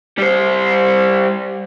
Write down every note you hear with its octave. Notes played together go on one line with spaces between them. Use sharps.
G3 C5